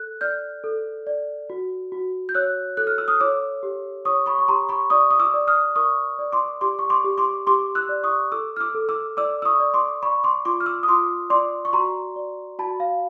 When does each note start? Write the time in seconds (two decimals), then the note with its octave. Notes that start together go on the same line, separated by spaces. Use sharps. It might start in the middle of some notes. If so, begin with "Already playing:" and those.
Already playing: A4 F#6
0.21 D5 F6 G6
0.64 A4
1.07 D5
1.50 F#4
1.92 F#4
2.29 G6
2.35 C#5 E6 F#6
2.77 A4 F#6
2.87 F6
2.98 E6
3.08 D#6 F6
3.20 C#5 D6 E6
3.63 G4
4.05 C#5 C#6 D#6
4.26 B5 C#6
4.38 C#6
4.48 G4 A#5 C6
4.69 B5 C#6
4.90 D5 C#6 D#6
5.10 D#6
5.19 D6 E6
5.34 D5
5.47 D#6 F6
5.76 A#4 C#6 D#6
6.19 D5
6.32 C6 D6
6.61 G4 C6 D6
6.79 C#6
6.90 C6 D6
7.04 G4
7.18 C6 D6
7.47 G4 C6 D6
7.75 E6 F#6
7.89 D5
8.04 C#6 D#6
8.32 A4 D6 E6
8.57 F6
8.60 D6 E6
8.75 A4
8.89 D6 E6
9.17 D5 D6 E6
9.42 E6
9.45 C#6 D#6
9.60 D5
9.74 C6 D6
10.02 D5 B5 C#6
10.24 C6 D6
10.45 F4 C6 D6
10.60 F6
10.66 D6 E6
10.83 D#6
10.88 F4 C6 D6
11.30 D5 C6 D6
11.65 C#6
11.73 F#4 A#5 C6
12.16 D5
12.59 F#4 A5 B5
12.80 F5